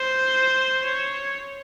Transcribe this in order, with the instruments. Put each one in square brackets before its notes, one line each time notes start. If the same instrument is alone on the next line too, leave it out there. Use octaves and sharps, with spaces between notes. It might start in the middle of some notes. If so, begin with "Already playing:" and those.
Already playing: [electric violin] C5
C#5